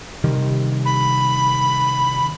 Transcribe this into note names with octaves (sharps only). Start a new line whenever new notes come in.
C3 D#3 G3
B5